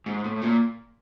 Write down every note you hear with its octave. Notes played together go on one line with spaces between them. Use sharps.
G#2
A2
A#2